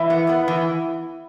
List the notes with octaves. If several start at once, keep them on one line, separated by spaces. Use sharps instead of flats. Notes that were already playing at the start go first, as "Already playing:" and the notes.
Already playing: E3 E4
B3
B3
E3